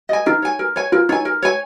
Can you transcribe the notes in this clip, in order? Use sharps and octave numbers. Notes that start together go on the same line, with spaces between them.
D#5 G#5
D#4 A#4
C#5 G#5
A#4
C#5 G#5
F4 A#4
D#4 C#5 G#5
A#4
C#5 G#5